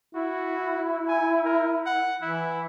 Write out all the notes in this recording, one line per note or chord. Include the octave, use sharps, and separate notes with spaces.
E4 F#4
G#5
A#4
F#5
E3 E4